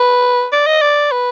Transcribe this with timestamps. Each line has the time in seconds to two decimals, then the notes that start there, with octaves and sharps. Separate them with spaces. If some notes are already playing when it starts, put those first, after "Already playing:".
Already playing: B4
0.52 D5
0.67 D#5
0.82 D5
1.12 B4